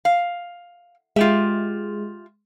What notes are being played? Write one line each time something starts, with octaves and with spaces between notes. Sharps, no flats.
F5
G#3 F4 G4 E5